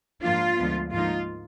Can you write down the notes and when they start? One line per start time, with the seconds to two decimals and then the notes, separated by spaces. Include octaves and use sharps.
0.22 G#2 F3 A#3 D4 F4
0.57 D2 D3 F3 G#3 B3
0.92 G#2 F3 A#3 D#4 F4